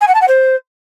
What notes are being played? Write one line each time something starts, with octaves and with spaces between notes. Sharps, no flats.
G#5
F#5
A5
F#5
C5